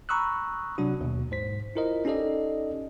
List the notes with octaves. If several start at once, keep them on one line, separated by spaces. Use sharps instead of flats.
A#5 B5 C#6 D#6 E6 F#6
C3 F#3 D4 F#4
D#2 B2
G#2 C5 B6
E4 F4 A#4 C5 D#5
C#4 D#4 G4 A4 D5 D#5